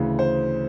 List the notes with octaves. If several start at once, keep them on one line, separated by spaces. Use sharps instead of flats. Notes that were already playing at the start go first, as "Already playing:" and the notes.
Already playing: D2 C#3 E3
C5